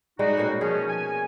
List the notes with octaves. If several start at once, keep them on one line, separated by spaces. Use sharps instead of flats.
G3 G#3 D#4 F#4
B2 A#3 C#4
F3 C#4 G#4
G#5